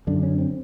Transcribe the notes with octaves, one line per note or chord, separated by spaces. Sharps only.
F#2 D3 D4
C#4
C4